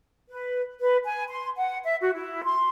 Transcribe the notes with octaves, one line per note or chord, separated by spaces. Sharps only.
B4
B4
G#5
C6
F#5
E5
F#4
E4
C6